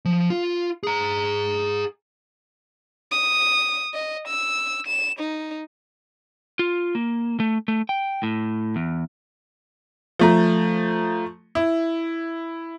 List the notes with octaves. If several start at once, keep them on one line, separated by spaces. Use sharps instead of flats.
F3
F4
G#4 A#5
D#6
D#5
E6
E7
D#4
F4
A#3
A3
A3
G5
A2
E2
F3 A3 A#5
E4